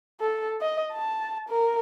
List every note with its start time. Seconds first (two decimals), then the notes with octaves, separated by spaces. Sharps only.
0.21 A4
0.61 D#5
0.93 A5
1.49 A#4